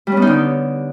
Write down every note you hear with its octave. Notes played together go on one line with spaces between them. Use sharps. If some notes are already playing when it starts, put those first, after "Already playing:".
G3
C#4
B3
D#4
D3